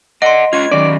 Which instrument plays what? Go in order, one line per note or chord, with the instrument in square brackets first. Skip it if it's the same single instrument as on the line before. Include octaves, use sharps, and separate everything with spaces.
[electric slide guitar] D5 F#5 [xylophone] D#5 C6
[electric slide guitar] C#4 F4 [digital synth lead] G#6
[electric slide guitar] D#3 F#3 C#4 [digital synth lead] D5